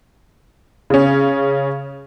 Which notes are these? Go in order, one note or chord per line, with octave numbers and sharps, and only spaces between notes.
C#3 C#4